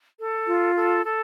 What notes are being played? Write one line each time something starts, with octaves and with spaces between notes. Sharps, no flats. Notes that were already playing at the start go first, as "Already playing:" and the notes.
A4
F4
A4
A4